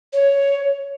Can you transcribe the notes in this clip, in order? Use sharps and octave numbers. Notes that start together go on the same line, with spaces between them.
C#5